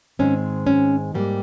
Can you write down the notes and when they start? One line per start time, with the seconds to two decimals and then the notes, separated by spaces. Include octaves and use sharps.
0.19 G#2 D#3 G#3 C4 C#4
0.67 C#4
1.14 G#2 G3 A#3